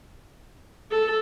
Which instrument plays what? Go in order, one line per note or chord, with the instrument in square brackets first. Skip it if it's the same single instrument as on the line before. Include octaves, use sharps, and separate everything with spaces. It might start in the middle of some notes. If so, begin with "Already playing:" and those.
[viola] A4